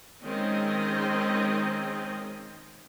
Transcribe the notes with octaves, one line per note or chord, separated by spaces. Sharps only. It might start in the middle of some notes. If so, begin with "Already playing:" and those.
D#3 G#3 C4 C#4 D#5